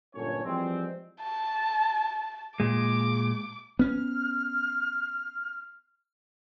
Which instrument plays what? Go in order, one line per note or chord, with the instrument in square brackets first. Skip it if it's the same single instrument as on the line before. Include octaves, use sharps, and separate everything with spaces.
[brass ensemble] G1 A#2 F#3 C#4 A4 C#5
E3 F3 G3 G#3 C4
[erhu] A5
[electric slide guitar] A#2 G#3 [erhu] D6
[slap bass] B3 C#4 [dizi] F6